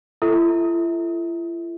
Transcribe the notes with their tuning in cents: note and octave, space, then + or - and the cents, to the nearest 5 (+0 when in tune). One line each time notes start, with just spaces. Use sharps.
E4 +45 A4 +0 E5 -30